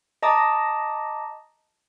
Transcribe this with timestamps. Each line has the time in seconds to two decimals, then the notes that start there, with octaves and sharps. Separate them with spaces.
0.23 D#5 A5 A#5 D6 D#6